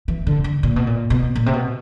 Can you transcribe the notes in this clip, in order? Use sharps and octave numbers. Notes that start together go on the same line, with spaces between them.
E3
D3
D3
A#2
B2
A#2
B2
A#2
C3
B2